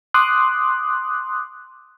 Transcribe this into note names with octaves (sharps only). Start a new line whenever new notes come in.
C6 D6 D#6 F#6